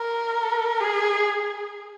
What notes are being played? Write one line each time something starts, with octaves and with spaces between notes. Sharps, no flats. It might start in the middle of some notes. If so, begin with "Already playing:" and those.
Already playing: A#4
G#4